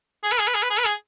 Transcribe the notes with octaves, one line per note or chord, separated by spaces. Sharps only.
G#4
B4
G#4
B4
G#4
B4
G#4
B4
G#4